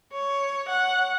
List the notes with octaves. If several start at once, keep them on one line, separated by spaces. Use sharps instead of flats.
C#5
F#5